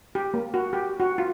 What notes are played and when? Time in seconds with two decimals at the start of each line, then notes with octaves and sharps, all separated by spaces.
0.15 G4
0.34 A#3
0.54 F#4
0.73 G4
1.00 F#4
1.18 F4